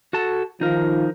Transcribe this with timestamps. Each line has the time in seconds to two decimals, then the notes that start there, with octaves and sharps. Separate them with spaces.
0.13 F#4 A4 A5
0.61 D#3 F3 D#4 F4 A#4